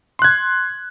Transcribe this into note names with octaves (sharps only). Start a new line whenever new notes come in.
C6 F#6 G#6